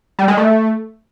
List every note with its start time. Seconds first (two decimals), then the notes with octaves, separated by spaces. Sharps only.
0.19 G3
0.28 G#3
0.37 A3